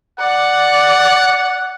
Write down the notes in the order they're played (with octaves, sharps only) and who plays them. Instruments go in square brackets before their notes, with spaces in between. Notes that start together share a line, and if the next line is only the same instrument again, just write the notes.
[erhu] D5 [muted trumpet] F#5